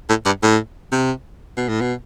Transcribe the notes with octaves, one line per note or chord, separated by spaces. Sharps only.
A2
G2
A2
C3
B2
A2
B2